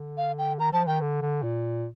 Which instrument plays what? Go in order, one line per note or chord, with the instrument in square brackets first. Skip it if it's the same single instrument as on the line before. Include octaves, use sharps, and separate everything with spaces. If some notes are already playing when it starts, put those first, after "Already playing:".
Already playing: [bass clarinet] D3
[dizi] F5
G5
[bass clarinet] D#3 [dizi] A#5
[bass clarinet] F3 [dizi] A5
[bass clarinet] D#3 [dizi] G5
[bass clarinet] D3
D3
A#2